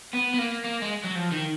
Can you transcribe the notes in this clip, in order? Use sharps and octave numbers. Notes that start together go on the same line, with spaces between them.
B3
B3
A#3
A#3
G#3
F#3
F3
D#3